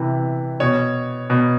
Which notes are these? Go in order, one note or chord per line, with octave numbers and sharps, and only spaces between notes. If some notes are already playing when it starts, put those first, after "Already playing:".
Already playing: C3 E3 B4
B2 C#5
B2